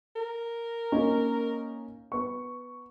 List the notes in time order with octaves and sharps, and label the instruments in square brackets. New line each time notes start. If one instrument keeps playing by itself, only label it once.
[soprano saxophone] A#4
[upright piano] A#3 C#4 D#4
B3 C#6